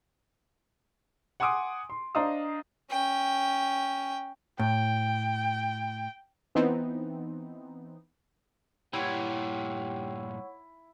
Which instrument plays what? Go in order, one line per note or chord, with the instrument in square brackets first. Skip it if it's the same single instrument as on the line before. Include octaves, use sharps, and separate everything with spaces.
[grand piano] F#5 G#5 C6 D6 D#6 D7
C6
D4 C5 D#5 F5 A#5 D#6
[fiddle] C#4 G5
[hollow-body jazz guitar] A2 [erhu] G5
[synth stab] E3 B3 C4 D#4
[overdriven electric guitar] G2 A#2 [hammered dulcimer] E4 [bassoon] G4 [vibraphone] C#5 F#5 C#6